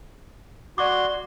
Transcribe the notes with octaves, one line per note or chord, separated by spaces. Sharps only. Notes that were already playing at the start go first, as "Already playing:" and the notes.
F#4 D5 C6 D6